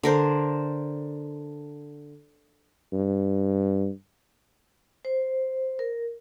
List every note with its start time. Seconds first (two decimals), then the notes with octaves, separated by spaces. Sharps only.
0.03 D3 A#4 C5
2.93 G2
5.05 C5
5.79 A#4